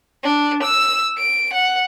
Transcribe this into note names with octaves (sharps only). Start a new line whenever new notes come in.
D4
E6
D7
F#5